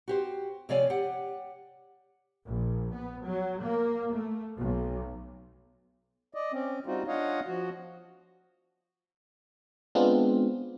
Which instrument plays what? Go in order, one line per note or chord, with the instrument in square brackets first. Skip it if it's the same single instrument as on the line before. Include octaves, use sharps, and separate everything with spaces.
[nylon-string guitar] F#4 G4 C5
C3 F3 C#5 D5 F5 G#5
G4 F#5
[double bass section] A#1
B3
F#3
A#3
A3
B1
[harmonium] D5 D#5
C4 C#4
G3 C4 D#4 F4 F#4
D4 F4 C#5 D#5 F5 F#5
F3 F#4
[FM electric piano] G#3 B3 C4 D4 F4